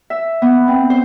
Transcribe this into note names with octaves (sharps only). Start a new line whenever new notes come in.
E5
B3
C4
C5